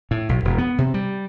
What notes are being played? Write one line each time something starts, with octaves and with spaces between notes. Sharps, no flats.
A2
B1
E1
B3
C3
G3